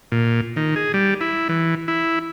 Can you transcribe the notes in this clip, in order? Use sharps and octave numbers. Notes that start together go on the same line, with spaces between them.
A#2
D#3
G#4
G3
E4
E3
E4